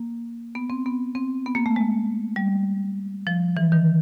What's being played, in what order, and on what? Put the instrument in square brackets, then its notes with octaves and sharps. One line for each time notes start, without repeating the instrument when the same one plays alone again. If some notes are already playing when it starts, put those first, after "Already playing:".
Already playing: [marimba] A#3
B3
C4
B3
C4
B3
A#3
A3
G#3
G3
F3
E3
D#3